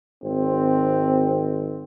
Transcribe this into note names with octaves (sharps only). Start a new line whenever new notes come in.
G#1 C4